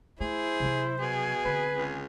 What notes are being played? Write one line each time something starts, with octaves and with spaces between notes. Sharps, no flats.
A3 E4 G#4 C5
C3 F#3
B2 G#4
D3 C4 B4
C#2